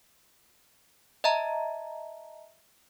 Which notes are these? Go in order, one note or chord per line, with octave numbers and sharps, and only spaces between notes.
D#5 E5 A5 A#5